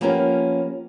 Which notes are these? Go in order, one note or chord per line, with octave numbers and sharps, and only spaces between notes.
F3 A#3 B3 C#4 G4 A#4